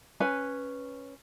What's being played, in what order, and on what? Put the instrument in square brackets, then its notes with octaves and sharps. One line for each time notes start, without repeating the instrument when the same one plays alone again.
[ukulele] C#4 B4 G#5